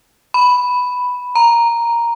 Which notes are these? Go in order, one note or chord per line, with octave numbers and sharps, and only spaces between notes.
B5
A#5